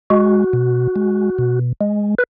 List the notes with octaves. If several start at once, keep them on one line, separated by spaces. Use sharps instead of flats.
G#3 F#4
B2
G#3
B2
G#3
B4